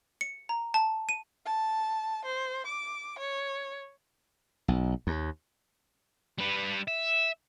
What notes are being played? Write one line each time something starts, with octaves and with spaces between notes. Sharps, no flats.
C#7
A#5
A5
D#7
A5
C5
D6
C#5
B1
D#2
G3 B4
E5